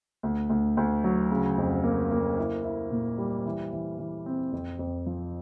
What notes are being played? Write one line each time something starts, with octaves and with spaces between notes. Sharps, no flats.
D2
D2
D2
F#3
C#3
F2
A#3
A#3
E4
E4
A#2
G3
E3
E3
E3
C4
F2
F2
F3